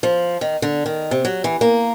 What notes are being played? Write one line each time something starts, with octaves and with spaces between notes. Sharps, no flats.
F3
D#3
D3
D#3
C3
F#3
E3
A#3